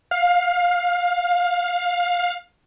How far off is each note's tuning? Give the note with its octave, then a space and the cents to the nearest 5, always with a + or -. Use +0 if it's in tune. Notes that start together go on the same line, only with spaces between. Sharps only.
F5 +20